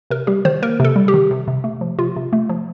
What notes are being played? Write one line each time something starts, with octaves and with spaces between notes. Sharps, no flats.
C3 A#4
G3 G4
D#3 C5
A#3 A#4
C3 A4
G3
G4
D#3
C3
C3
A3
F3
C3 F4
C3
A3
F3